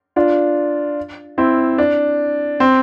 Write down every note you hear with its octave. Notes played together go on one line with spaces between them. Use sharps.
D4 F4
C4 E4
D4
C4